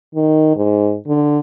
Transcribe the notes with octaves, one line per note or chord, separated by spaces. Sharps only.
D#3
G#2
D3